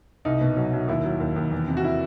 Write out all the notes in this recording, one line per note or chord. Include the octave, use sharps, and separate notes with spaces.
C2 D#4
B2
F#3
F#3
D#2 E4
F#3
D#2
D#2
E2
C3
F#4
E4